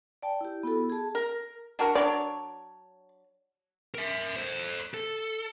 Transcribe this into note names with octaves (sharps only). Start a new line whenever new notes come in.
D5 G5 A5
E4 G4
B3 E4 F#4 A4
G#4 A5
A#4
D4 F#4 A#4
F#3 D4 C#5 D5
A#4 E5
A4 C5
A4